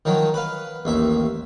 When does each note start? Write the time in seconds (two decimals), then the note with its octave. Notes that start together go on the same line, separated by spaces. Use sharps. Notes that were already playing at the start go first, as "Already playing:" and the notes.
0.05 D#3 F3 F#3
0.34 B4 F5
0.85 A1 D#2 E5